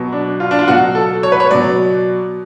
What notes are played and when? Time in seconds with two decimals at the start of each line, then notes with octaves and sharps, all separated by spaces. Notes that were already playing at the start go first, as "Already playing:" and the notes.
Already playing: B2 F#3
0.12 D4
0.40 F4
0.51 D4
0.59 F4
0.68 B2 F#3 F#4
0.95 A4
1.23 C#5
1.32 B4
1.40 C#5
1.51 B2 F#3 D5